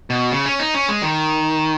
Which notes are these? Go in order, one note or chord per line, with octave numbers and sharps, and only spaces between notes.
B2
C#3
C#4
D#4
C#4
G#3
D#3